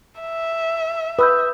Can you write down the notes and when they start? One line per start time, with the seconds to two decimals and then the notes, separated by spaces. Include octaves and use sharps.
0.21 E5
1.19 B4 D#6 E6 G6